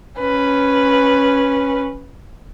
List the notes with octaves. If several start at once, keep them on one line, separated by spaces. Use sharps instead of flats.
C#4 B4